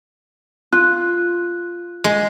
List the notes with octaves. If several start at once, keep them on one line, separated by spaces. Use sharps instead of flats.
F4 F#6
G#3